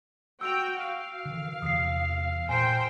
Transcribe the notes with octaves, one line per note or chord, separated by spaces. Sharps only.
F#4 G5 E6 D7 F7
F5
D3 E3
E2 C3 D#6 C7
A#2 A#4 C5 G5 G#5 C7